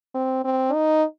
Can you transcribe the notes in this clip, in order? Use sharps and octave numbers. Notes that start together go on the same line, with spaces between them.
C4
C4
D#4